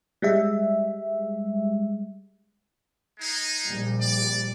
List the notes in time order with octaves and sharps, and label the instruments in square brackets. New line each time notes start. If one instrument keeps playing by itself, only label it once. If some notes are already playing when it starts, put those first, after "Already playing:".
[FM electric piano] G3 G#3 E5
[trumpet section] G#3 D#4
[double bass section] A#1 G3
[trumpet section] D5